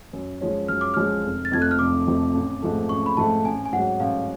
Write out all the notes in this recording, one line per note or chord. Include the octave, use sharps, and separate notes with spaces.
F#2
F3 G#3 C#4
F#2 F6
D6
F3 G#3 C#4 F6
F1
A6
F2 F3 A3 G#6
F#6
F6
F1 D6
F2 F3 A3
A1
G#2 F3 A3
A1 C#6
B5
G#2 F3 A3 A5
A1 G#5
G#5
G#2 F#3 F#5
A1 F5